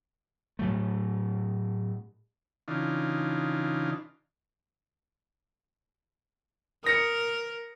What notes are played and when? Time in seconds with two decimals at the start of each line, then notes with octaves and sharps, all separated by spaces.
0.59 A2 F#3 A3
2.68 C#3 E3 D4 D#4 F4
6.84 A#4 D#6 A#6 C#7